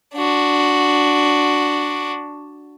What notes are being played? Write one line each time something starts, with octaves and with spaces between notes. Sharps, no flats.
D4 F#4